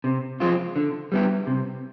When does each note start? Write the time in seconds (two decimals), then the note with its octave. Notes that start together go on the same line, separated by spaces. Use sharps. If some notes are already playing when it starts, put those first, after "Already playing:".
0.04 C3
0.40 F3 G#3 C4 F4
0.76 D3
1.12 G3 B3 E4 G4
1.47 C3